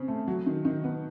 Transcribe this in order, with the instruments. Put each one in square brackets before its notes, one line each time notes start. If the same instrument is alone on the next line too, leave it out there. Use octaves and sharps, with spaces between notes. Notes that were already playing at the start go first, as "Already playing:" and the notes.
Already playing: [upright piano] C#3 C4
A3
F#3
D#3
D#3
B3